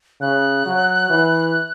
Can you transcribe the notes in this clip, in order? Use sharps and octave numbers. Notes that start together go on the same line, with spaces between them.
C#3 F#6
F#3
E3